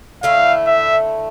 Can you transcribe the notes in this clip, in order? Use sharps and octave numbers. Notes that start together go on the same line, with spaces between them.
D3 A3 E4 F5
E5